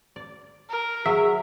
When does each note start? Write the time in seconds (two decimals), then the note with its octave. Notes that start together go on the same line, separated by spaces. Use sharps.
0.16 D5
0.70 A#4
1.06 F#3 G#4 E5